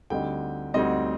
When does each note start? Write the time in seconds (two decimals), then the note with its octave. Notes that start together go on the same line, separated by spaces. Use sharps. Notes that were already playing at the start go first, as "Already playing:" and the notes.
0.10 D2 D3 G3 C4 D#4 G5
0.74 D2 D3 G3 C4 D#4 D#5